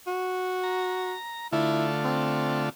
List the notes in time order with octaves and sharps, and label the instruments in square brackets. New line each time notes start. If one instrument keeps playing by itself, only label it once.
[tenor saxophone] F#4
[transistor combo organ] A#5
[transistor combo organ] D3 A3 F4 [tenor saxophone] E4
[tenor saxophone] C4